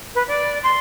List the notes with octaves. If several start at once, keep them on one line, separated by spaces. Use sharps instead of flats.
B4
D5
C6